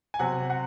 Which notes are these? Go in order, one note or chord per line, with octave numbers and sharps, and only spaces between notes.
G#5
C3 F#3 C4 F#5
F#5